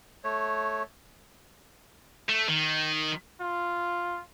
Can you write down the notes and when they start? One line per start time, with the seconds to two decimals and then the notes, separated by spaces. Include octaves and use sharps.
0.24 A3 C#5
2.29 A3
2.48 D#3
3.41 F4